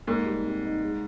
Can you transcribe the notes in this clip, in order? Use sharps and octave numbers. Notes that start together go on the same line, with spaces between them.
G#2 A#3
G3
C3
D#4
G#3